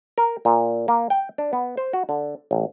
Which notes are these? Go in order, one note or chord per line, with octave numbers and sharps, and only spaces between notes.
A#4
A#2
A#3
G5
D4
B3
C5
F#4
D3
A1